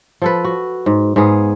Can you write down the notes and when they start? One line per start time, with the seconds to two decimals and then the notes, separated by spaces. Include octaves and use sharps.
0.22 F3 A4 B4
0.44 F#4
0.86 G#2
1.16 G#2 B3 G#4 F5